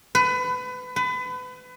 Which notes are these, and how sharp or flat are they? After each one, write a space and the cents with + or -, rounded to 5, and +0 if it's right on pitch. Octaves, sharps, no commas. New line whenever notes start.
B4 +25
B4 +30